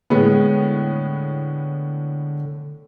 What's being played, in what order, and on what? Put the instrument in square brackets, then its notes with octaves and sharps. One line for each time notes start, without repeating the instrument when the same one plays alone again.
[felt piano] A2 G#3 B3 [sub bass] D3